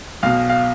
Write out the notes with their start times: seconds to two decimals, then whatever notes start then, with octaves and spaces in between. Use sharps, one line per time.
0.23 B1 B2 F5
0.50 F5